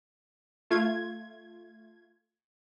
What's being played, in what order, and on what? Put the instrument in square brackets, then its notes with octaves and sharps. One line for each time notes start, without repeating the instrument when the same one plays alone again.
[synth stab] A3 F4 G#6